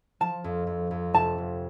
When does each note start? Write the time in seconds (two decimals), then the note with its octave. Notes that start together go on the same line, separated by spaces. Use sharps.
0.20 F3 A5
0.44 F2
0.67 F2
0.91 F2
1.14 F1 A5
1.38 F1